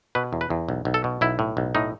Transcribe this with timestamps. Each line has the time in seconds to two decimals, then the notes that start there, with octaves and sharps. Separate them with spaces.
0.15 B2 B4
0.33 E2
0.41 B4
0.50 E2
0.69 B1
0.85 B1
0.94 A4
1.04 B2
1.21 B1 E4
1.39 A2
1.57 B1
1.75 A2 D#4